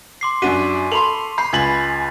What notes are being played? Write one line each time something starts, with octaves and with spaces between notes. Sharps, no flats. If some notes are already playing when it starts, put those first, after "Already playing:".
C6 D6 C7
F#2 D4 F#4 C#6 B6 D#7
A4 B5 C6 F7 F#7
B5 G6 C7
C#2 G#5 G#6 A6 B6 F#7